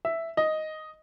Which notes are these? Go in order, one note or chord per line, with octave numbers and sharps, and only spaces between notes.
E5
D#5